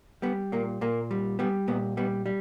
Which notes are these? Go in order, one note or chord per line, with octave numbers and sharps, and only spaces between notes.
G3 B3
A#2 A#3
A#2 A#3
G3
G3 B3
A#2 B3
G3 B3
G3